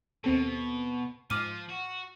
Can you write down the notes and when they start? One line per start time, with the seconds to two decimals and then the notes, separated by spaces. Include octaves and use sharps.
0.24 D#2 B2 C4 A4
1.30 G#2 F3 D6 F6 D#7
1.69 F#4